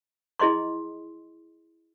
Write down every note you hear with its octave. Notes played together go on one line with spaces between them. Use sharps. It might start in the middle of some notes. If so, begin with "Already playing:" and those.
E4 G#4 D#5 C6 C#6